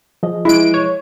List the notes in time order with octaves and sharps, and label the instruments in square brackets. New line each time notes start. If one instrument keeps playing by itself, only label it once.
[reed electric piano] F3 G#4 D#5
[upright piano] E3 G#3 [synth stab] E4 D7
[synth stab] C#5